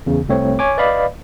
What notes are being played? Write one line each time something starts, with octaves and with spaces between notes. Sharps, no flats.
E2 C#3
C2 A3 C4 C#5
C#5 G#5 D6
B4 D5 D#5 F5 B5